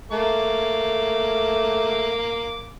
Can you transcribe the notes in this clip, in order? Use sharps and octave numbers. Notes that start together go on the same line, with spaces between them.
A3 A#3 D6